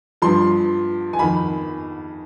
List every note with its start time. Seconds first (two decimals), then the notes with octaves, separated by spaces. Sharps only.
0.22 G2 F3 C6
1.13 G#5
1.19 F2 D#3 B5